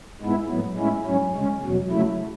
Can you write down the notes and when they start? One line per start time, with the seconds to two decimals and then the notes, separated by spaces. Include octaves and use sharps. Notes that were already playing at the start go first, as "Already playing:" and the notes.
0.21 G#2 G#3 B3 E4
0.50 A2 F#3 B3
0.77 A2 G#3 C#4 E4
1.06 G#2 F#3 C#4
1.34 C#3 G#3 C#4
1.63 E2 B2 F#3
1.91 C#3 F#3 A3 E4